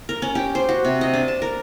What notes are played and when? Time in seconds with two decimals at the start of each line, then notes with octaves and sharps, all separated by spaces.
0.09 A#4
0.22 C#4
0.35 G4
0.55 C5
0.69 F#4
0.85 C3
1.01 D#5
1.13 D4
1.28 A5
1.42 A#4